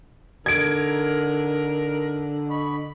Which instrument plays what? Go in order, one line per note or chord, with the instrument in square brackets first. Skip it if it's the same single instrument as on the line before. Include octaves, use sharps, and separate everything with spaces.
[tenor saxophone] D3 [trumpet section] D#4 A#4 [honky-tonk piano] G#6 D7
[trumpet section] D#5 B5 C#6